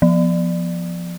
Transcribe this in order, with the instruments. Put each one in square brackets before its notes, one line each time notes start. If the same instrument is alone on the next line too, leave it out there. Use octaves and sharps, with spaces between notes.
[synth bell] F3